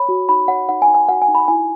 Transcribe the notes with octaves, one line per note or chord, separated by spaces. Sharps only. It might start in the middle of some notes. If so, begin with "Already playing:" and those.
Already playing: C#5 B5
F#4
D#4 B5
C#5 F#5
D#4 F#5
G#5
D#4
G#5
F#4 F#5
G#5
D#4
B5
E4 G#5